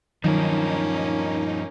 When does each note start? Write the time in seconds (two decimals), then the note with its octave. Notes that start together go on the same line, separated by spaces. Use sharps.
0.24 G2 D#3 F3 F#3 A#3 C#4 D#4